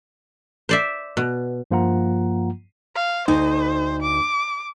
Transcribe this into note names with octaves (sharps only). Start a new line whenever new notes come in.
C5 D5 E5
B2
G2 F3 A#3 F4 F#5 A#5
F5
D2 D#4 C5
D6